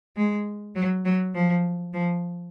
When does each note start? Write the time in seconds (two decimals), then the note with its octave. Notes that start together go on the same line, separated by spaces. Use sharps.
0.17 G#3
0.75 F#3
1.05 F#3
1.34 F3
1.93 F3